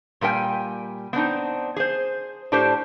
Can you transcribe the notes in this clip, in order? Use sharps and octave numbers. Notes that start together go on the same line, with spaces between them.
A#2 G3 A#4 G5 G#5
B3 C4 D4 D#4
G#4 C5
A2 D4 G4 A4 C5